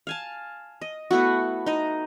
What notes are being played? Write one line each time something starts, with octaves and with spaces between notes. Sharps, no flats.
F5 G#5 A5
D#5
A3 B3 E4 F#4
D#4 D#5